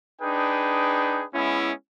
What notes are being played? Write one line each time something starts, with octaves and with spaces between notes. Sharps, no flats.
D4 D#4 G#4 B4 G5
G#3 B3 C#4 E4